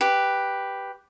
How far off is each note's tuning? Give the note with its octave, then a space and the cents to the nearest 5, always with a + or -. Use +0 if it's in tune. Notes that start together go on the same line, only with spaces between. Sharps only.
G4 +0 B4 +0